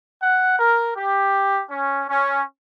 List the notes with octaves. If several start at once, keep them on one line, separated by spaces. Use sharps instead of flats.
F#5
A#4
G4
C#4
C#4